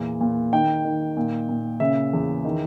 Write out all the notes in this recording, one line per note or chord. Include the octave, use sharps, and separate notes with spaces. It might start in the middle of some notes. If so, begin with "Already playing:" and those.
Already playing: E2 A#2
A#2
D#3 G5
D#3
A#2
A#2
C#3 E5
E2
D#3